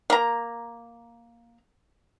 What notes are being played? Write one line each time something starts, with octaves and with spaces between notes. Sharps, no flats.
A#3 A#5